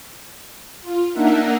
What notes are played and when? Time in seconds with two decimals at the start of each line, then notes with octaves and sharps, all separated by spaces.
0.82 F4
1.13 A#3 D4 D#4 A#4 E5 F#5